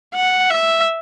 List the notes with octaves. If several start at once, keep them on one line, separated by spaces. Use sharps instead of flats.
F#5
E5